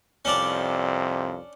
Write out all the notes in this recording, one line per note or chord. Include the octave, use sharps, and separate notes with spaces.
C2 F2 C3 C#4 D4 D5